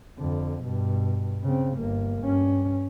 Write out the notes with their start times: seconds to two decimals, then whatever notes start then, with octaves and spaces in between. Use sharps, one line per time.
0.18 F2 D3
0.62 G2 B2
1.44 C#3 C4
1.77 G1 A#3
2.23 G2 C#4